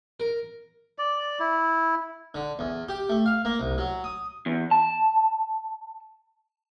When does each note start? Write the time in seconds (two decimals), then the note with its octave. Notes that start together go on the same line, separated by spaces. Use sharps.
0.20 A#4
0.98 D5
1.40 E4
2.34 D3
2.59 E2
2.88 G4
3.09 A3
3.26 F5
3.45 A#3
3.60 C2
3.78 F#3
4.04 D#6
4.46 E2
4.71 A5